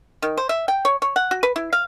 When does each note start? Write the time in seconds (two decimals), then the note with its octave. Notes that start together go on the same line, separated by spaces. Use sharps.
0.22 D#3
0.37 C5
0.49 E5
0.68 G5
0.85 C#5
1.02 C#5
1.16 F#5
1.31 F#4
1.43 B4
1.56 E4
1.73 F5